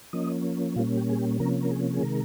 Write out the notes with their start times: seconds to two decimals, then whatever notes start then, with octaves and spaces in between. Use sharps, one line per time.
0.13 F3 A#3 C#4 D#5
0.76 A#2 G3 A#3 C#4 F4
0.97 G4
1.10 G#4
1.19 G4
1.40 C3 F3 A#3 C#4 A#4
1.63 A#4
1.71 G#4
1.93 G#4
2.03 C3 D#3 G#3 A#4